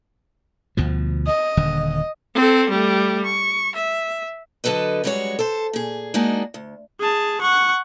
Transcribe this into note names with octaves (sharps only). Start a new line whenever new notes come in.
D2 B2 F3
D#5
D#1 D3
C4 A4
G3 A3
C#6
E5
D3 F#3 A4 B4 D#5
F#2 G3 G#3 F#4 A#4 C#5
A4 C5
A#2 G#4
G#3 A#3 D4 D#4 F#4
D2
G#4 A5
F#5 C#6